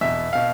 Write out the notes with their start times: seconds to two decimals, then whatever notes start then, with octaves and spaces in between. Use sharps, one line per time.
0.01 E2 B2 E5
0.33 B2 F5